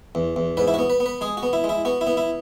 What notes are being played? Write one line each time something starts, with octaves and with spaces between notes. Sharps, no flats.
E2
E2
G#2 B4
E4
B3 F#4
B4
B3
B4
G#3 G#4
F#4
B3
E4
G#3
E4
B3 F#4
E4
B3
E4